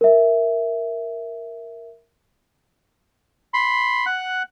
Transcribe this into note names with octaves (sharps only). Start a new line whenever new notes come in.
A#4 E5
B5 C6
F#5 F#6